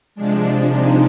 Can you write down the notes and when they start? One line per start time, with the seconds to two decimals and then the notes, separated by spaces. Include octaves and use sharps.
0.15 C3 F3 G#3 D4
0.68 D#4